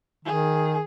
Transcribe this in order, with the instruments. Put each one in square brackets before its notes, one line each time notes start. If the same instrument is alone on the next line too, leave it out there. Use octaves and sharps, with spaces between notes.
[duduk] D#3 [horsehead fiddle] G#4